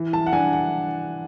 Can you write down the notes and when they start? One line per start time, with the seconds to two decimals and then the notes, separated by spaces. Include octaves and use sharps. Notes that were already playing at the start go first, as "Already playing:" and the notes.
Already playing: E3
0.13 A5
0.26 F#5
0.33 D4 G#5
0.53 F#5